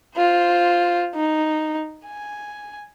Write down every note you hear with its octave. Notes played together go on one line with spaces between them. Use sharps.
F4 C5
D#4
G#5